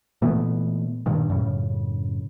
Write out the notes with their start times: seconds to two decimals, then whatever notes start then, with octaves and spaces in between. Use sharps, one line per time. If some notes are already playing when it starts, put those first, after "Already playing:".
0.22 A#2 E3 A3 B3
1.06 G2 A#2 D#3
1.30 F#2 A2 C#3